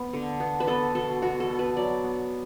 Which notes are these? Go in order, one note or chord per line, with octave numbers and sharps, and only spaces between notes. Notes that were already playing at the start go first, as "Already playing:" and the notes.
Already playing: B3
D3
B3
B4
B3 A4
B2 A4
B2 F#4
A4
B3
B4
F#3 D5
B3